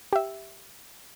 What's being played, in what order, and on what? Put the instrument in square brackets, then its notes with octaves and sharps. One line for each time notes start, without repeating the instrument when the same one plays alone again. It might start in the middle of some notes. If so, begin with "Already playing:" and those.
[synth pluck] G4 E5